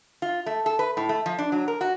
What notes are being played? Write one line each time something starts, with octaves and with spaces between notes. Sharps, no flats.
F4
A3
A4
B4
A2
A3
F3
D4
F#3
A#4
F#4